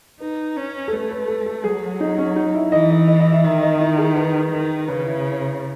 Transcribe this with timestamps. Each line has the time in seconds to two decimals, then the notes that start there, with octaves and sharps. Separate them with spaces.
0.20 D#4 B4
0.57 C#4
0.88 A4
0.93 A3 B4
1.11 B4
1.28 A4
1.46 A4
1.64 F#3 G#4
2.00 D#4
2.18 C#4
2.36 D#4
2.54 E4
2.72 E3 D#5
2.90 D#5
3.08 D#5
3.20 D#5
3.32 E5
3.44 D#3 E5
3.62 D#5
3.80 E4
3.98 G#4
4.16 B4
4.53 D#3
4.88 C#3 B4
5.06 E4